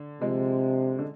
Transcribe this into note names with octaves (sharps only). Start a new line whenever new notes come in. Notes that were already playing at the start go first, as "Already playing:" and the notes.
Already playing: D3
C3 F3 G#3
D3